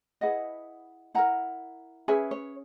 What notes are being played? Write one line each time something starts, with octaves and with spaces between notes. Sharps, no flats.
E4 G#4 B4 D#5 F#5
E4 A#4 F#5 A#5
C#4 G#4 B4 E5 G#5
C#5